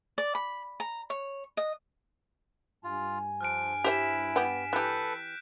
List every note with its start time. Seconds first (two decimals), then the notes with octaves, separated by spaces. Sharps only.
0.18 D5
0.35 B5
0.80 A#5
1.10 C#5
1.57 D#5
2.84 G2 F4 G#5
3.41 F3 F6 F#6 D7
3.84 E4 G4 C5 E5 B6 E7
4.36 B3 G4 D7
4.73 E3 G4 A4 B4 F#6 G6